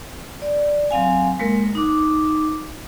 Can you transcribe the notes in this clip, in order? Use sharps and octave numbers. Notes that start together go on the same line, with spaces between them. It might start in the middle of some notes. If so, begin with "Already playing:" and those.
D5
F#3 C4 F5 G#5
G#3 A#3 A#4
D#4 D6